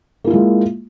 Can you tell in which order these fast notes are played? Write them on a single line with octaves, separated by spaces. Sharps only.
A#3 E4 F4 G#3